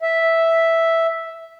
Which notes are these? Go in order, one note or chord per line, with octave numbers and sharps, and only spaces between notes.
E5